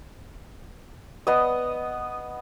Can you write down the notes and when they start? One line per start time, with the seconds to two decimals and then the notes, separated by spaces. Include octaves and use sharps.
1.27 B3 D#5